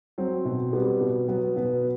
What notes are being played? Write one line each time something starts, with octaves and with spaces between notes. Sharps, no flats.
F#3 C4
B2
G3 B3
B2
F#3 B3
B2 B3